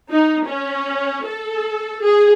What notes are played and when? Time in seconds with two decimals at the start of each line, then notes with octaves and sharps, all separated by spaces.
0.11 D#4
0.45 C#4
1.24 A4
2.04 G#4